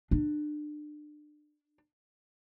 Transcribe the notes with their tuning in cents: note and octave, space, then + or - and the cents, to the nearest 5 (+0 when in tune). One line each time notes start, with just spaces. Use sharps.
D4 +30